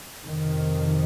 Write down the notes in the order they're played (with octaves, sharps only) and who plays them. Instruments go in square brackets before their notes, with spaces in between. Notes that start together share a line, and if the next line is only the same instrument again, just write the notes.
[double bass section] F2 C3 D#3